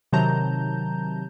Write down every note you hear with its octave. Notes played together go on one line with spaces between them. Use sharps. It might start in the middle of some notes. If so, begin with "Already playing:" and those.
C3 D#3 F#3 A5 A#5 G6